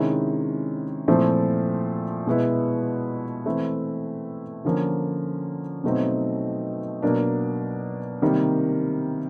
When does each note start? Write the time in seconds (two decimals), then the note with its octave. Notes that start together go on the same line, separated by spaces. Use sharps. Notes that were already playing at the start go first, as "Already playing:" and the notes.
Already playing: C3 D#3 G#3 C#4 E4
1.08 A#2 F3 A3 C4 E4
2.27 B2 G#3 B3 E4
3.46 E3 A3 C4 E4
4.65 D3 F3 A#3 C#4
5.84 B2 F#3 A3 C4 D#4
7.02 B2 F#3 A#3 D4
8.22 C3 D#3 G3 A#3